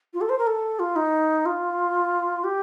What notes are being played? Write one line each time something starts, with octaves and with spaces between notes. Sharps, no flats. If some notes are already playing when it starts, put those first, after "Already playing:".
F4
A4
C5
A#4
A4
F4
D#4
F4
G4